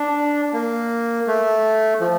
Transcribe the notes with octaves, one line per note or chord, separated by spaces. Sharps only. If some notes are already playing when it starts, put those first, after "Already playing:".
Already playing: D4
A#3
A3
F3